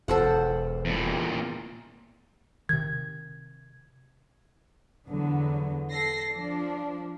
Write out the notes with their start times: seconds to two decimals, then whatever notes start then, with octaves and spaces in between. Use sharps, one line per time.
0.08 E1 A4 C5 F#5
0.85 E2 A#2
2.69 C3 D#3 G#6
5.07 E2 D3 F#3 B3
5.91 A4 A#6 C7
6.32 F3 D4